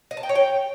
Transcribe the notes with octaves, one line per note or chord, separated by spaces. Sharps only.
D#5
A5
G5
C#5
G5